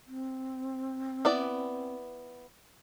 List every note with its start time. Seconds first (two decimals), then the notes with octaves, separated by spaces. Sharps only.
0.07 C4
1.25 B3 E4 D5